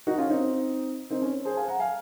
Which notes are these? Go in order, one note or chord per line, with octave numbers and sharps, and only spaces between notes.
D#4 F#4
C#4 F4
C4 D#4
C4 D#4
C#4
G#4 C5
F5 G#5
F#5 A#5
F5 G#5